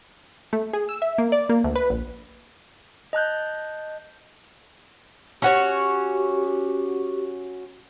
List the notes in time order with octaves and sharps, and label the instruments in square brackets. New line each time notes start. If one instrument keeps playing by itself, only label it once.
[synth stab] A3
G#4
E6
E5
A#3
D5
A#3
D2
B4
A#1
[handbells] D#5 A5 F#6 G6
[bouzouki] C#4 F#4 C#5 [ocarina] G4